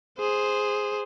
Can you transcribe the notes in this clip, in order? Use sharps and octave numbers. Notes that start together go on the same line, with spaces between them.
G#4 C5